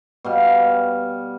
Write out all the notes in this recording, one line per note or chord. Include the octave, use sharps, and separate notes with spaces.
B2 G3 F5